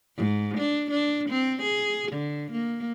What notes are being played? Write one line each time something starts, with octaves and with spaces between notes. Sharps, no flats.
G#2
D4
D4
C4
G#4
D3
A#3